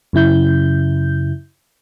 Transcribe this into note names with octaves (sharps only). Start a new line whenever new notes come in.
F#2 C#3 E4 G6